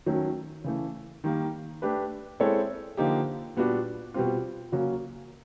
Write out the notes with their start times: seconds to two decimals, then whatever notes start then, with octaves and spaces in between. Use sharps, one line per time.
0.06 D#3 F#3 A3 C#4
0.64 C#3 E3 A3
1.24 D#3 G3 A#3
1.82 A3 D4 G4 B4
2.40 G#3 C4 E4 A4 C#5
2.97 D3 F3 A#3 D#4 G4
3.56 A#2 G3 B3 D4 F#4
4.14 B2 G3 C4 F4
4.72 C#3 F#3 A#3 C#4 F#4